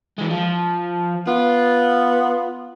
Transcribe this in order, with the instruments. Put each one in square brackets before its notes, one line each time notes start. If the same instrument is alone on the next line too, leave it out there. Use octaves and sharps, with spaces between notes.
[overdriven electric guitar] E3 G#3
F3
[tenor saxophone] B3 [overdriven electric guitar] F4